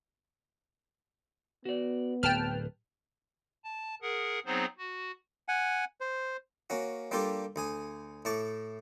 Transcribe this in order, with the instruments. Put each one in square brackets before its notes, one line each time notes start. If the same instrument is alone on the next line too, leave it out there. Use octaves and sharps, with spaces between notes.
[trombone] B3 [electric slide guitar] F#4 D5
[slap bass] D1 [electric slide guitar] B4 [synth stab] G5 A5 F6
[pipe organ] A5
G#4 A#4 F#5
F#3 B3 C4 D#4 G#4 C5
F#4
[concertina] F#5 G#5
C5
[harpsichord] A#3 C#4 F#4
G3 A#3 D4 F4 G4 A4
D2 G#4 G#5
A2 A5 C#6 D6